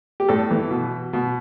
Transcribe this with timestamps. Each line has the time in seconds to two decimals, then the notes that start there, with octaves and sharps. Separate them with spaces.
0.20 G4
0.28 A2 A4
0.51 E3
0.71 B2
1.13 B2